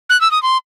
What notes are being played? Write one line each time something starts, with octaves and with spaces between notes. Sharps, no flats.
F#6
E6
D#6
C6